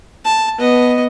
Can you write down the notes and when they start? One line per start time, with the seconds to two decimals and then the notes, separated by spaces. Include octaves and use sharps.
0.25 A5
0.59 B3 D#5